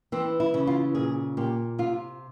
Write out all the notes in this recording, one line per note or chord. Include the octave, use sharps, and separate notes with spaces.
E3 C4
E4
C#3
F4
A#2 G#4
A#2 G4
C3 F4